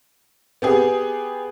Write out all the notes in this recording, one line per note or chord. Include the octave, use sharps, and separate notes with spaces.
B3 G4 G#4